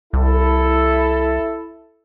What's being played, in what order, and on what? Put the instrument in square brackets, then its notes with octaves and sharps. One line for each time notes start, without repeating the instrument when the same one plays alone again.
[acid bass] C2 [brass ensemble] E4 A4